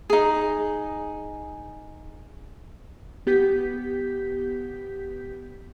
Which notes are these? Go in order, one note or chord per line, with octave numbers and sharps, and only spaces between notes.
D#4 G#4
B3 G4 G6 B6